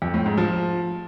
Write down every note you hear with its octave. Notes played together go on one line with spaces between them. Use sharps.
F2
A2
G#2
F3